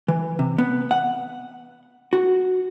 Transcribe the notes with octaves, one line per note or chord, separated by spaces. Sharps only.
E3
C3
B3
F#5
F#4